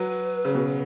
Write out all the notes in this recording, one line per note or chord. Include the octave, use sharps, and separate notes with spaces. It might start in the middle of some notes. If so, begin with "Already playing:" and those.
Already playing: F#3 B4
C#3
B2